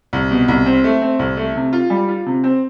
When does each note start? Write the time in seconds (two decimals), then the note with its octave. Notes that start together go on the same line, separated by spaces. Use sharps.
0.13 C2
0.31 B2
0.48 C2
0.66 C4
0.84 A3
1.02 C4
1.19 C2
1.37 A3
1.55 C3
1.73 F4
1.90 G3
2.09 F4
2.26 C3
2.44 C4